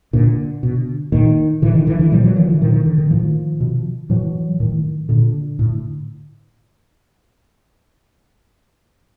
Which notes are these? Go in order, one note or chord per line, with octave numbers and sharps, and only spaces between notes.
A#2 D3
B2
A#2 D#3
A2 D3 E3
D#3
D3 E3
D3 E3
A#2 F3 G3
E3 F#3
D#3 F3
D3 E3
A#2 D#3 F3
D#3
D3
D#3
A2 D#3 F3
B2
A2 E3 F#3
A2 D#3
A#2 D3
A2